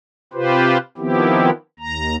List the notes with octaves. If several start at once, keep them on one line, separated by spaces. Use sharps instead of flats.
C3 F4 G4 B4 C5
D#3 F3 B3 C4 E4 G4
D#2 A#5